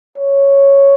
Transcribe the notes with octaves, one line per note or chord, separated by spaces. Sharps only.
C#5